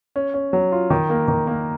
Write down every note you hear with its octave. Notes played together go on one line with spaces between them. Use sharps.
C#4
C#4
F#3
F4
D#3
A#3
D#3
A#3